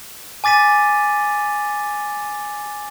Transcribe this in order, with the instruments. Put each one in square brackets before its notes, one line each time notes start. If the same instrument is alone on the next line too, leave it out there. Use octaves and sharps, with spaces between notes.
[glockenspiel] G#5 D6 A6 B6 D#7